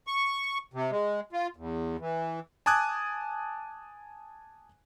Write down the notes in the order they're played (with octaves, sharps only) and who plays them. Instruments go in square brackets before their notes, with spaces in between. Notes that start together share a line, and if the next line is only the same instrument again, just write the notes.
[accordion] C#6
C3
G#3
F4
E2
E3
[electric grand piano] G#5 A5 D6 D#6 F#6 G#6